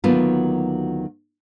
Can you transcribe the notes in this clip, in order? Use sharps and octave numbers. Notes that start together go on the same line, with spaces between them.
D2 D#3 F#3 A#3 B3 F4